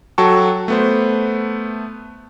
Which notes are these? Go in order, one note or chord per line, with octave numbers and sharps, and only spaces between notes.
F#3 F#4 A4 G5 A5 C#6
A3 B3 C5